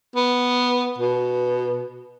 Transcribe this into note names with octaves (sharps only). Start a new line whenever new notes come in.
B3
B2